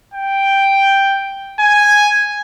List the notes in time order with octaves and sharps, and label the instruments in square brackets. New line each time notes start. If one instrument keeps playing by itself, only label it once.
[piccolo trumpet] G5
G#5